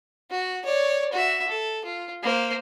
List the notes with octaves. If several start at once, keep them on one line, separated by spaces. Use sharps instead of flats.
F#4
C#5 D5
F#4 E5
A4
F4
A#3 C5